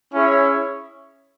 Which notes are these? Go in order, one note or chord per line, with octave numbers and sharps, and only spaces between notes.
C#4 E4 G#4 C#5 E5